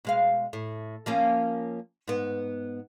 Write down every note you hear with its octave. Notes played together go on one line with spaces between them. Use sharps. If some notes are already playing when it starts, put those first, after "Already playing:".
B2 G#3 F5
A2
F3 A#3 C#4
G#2 B3